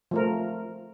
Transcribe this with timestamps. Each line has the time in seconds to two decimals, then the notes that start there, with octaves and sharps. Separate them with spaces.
0.11 F3 A3 A#4